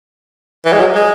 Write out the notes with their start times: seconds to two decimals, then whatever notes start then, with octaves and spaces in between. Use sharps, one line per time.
0.65 E3
0.73 G#3
0.80 F#3
0.95 G#3